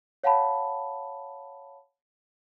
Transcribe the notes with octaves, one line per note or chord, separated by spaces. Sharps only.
C#5 F5 F#5 A5 B5